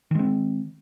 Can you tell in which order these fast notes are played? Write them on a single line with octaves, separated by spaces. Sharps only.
D#3 G#3 C4